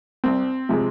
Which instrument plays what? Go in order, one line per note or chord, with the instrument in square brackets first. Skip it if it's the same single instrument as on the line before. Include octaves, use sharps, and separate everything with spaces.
[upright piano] C2 C4
C3 F3 G#3